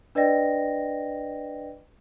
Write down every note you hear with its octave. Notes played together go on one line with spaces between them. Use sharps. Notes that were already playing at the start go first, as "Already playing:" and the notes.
D4 B4 D5 D#5 G5 A#6